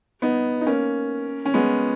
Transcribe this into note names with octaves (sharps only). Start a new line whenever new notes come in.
B3 D#4
D#4
A#3 C#4
C#4
G#3 B3